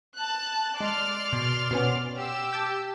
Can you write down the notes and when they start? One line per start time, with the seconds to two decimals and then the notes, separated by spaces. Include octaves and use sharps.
0.16 A5 F#6
0.78 G#3 D5 C6 F6 F#6
1.33 B2
1.71 B2 B3 C#4
2.16 G4 E6
2.53 A5 D6 G6